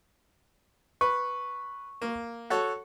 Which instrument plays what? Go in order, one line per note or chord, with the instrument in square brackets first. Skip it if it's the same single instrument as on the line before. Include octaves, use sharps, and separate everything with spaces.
[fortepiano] B4 [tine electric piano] C#6
[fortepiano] A#3
F#4 A4 C#5